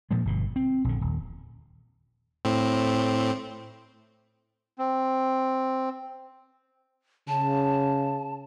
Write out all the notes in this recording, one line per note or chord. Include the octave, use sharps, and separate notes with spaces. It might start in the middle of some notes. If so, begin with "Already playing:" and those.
A#2 F3 G#3
G1 B2
C4
A#1 D3
D#1
A2 C4
C4
C#3 A5